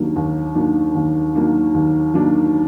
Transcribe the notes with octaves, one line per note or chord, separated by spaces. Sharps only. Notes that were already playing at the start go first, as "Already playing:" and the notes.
Already playing: D#2 D#3 F#3 A#3 D4
D#2
D#3 F#3 A#3 D4
D#2
D#3 F#3 A#3 D4
D#2
D#3 F#3 A#3 D4